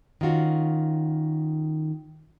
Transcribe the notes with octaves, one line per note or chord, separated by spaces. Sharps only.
D#3 C#4 F4 F#4